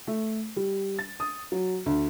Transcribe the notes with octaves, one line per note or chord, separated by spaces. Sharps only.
A3
G3
A6
D#6
F#3
D2